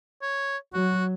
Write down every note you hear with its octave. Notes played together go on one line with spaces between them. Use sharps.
C#5
F#3 F#4